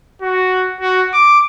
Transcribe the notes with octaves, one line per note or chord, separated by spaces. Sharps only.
F#4
F#4
D6